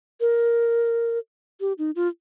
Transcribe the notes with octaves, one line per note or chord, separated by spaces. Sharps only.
A#4
G4
D#4
F4